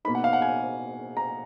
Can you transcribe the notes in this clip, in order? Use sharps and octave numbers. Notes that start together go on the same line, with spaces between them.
B2 A#3 D#4 B5
F#5
F5
F#5
G#5
A#5